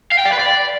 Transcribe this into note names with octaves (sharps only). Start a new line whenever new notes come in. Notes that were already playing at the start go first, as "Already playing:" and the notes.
F5
G5
D5
B4
D5